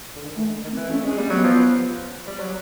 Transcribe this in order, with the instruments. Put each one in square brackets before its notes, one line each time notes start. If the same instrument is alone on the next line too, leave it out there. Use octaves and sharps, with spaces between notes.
[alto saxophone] D3
D#3
[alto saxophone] E3 [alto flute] A3
[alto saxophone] D3
D#3
[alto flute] C4
[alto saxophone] E3
[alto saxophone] A3 [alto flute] C#4
[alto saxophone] G#3 [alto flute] C#4
[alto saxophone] G3 [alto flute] A#3
[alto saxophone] F#3 [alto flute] B3
[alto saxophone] F3
G3
F#3